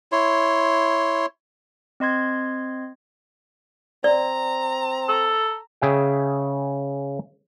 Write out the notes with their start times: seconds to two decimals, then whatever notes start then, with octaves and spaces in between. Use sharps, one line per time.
0.12 E4 C#5 C6
2.00 C4 D#5 C6 G#6
4.04 C4 D5 A#5
5.09 A4
5.82 C#3 G#4 E5 G5